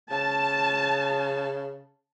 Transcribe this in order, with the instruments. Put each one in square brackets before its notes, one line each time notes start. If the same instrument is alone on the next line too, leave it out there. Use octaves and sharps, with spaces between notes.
[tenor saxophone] C#3 [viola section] A5